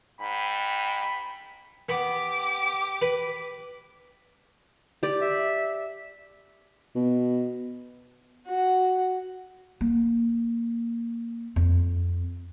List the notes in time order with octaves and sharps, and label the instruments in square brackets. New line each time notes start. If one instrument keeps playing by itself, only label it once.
[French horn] G#2 [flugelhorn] G5 [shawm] B5
[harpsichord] B3 [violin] G4 D6
[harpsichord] B4
[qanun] G4 D5
[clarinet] E5
[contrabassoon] B2
[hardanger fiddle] F#4
[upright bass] A#3
F2